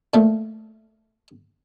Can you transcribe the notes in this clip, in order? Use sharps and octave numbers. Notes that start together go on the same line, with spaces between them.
A#2 F3 A3